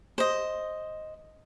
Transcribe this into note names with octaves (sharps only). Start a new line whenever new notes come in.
C5 D#5